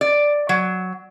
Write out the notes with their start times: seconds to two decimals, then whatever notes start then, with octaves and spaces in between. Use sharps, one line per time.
0.01 D5
0.49 F#3